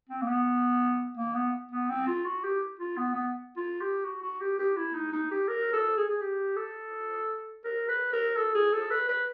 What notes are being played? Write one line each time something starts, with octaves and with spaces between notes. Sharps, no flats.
C4
A#3
B3
A#3
B3
B3
C4
F4
F#4
G4
F4
B3
B3
F4
G4
F#4
F#4
G4
G4
E4
D#4
D#4
G4
A#4
A4
G#4
G#4
G4
A4
A#4
B4
A#4
A4
G#4
A4
B4
B4